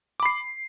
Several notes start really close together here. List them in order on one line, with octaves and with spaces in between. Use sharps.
D6 B5 C7